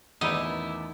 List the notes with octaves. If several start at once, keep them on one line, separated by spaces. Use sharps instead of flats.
A1 E2 D#3 D#4 E4